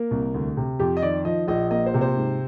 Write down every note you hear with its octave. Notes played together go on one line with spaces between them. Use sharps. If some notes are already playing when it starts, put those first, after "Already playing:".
Already playing: A#3 A#4
C2
D2
C3
F2 G4
D#5
D#3 D5
F3 D#5
A#1 D#5
A#3 D#5
C5
C3
C5
G#2